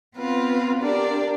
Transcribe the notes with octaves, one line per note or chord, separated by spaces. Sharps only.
B3 C4 F4 B4 F5
D4 G4 A#4 D5